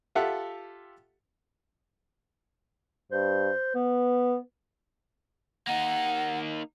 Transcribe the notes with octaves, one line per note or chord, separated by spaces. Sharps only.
F4 G4 A4 E5 F#5
G2 C5
B3 B4
A#3 D#4 F#5